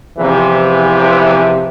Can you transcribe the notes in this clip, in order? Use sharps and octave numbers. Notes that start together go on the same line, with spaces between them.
E2 C3 E3 F3